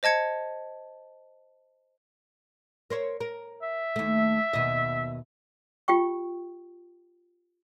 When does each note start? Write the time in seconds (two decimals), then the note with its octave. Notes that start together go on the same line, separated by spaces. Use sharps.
0.03 C5 D#5 A5 G#6 C#7
2.90 A#4 C5 C#5
3.20 A#4
3.62 E5
3.96 D#2 A3
4.53 D#2 B2 D#5
5.88 F4 G4 G5 C#6